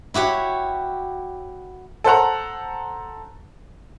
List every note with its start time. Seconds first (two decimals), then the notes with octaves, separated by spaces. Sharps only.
0.14 E4 F#4 G4 C#5
2.04 A4 C5 F#5 A#5